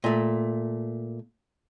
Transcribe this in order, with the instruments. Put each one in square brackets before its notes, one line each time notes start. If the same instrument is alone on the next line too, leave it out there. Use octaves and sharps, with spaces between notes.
[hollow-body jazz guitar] A#2 A3